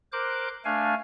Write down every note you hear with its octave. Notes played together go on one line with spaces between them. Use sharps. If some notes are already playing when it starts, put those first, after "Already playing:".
A#4 C5 D6 F#6 G6
A3 D4 F5 G#5